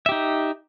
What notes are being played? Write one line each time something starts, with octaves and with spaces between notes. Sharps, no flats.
D#4 G4 E5